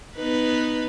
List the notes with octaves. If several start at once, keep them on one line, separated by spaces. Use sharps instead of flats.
B3 D#4 B4